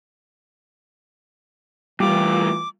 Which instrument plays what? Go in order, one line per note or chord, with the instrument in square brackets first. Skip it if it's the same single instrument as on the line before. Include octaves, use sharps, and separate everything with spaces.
[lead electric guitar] A2 F4 [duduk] E3 [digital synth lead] G3 [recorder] D6